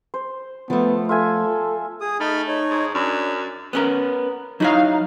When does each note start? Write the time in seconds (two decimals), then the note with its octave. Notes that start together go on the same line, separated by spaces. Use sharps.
0.14 C5
0.70 F3 A3 B3
1.09 F4 A4 E5 G#5
2.01 G#4 D#6
2.20 A3 D#4 B5 F6
2.48 D#4 C#5
2.70 G#2
2.95 F#2 D4
3.73 B3 C#4 A#4
4.60 F#3 D#4 E4 C#5 F5